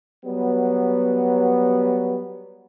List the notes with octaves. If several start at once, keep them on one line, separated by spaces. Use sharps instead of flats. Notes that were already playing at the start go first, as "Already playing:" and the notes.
F#3 G3 B3